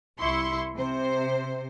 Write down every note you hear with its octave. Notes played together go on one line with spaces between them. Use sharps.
C2 E4 C6 C#6
C3 C5